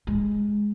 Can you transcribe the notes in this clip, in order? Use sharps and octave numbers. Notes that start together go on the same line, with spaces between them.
G#3